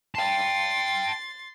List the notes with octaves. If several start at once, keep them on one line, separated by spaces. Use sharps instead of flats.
G5 A5 C6 A6